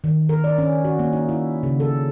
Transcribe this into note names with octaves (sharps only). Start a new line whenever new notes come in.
D#3
A#4
D5
C#4
F#4
A#3
D#4
E4
C#3
A4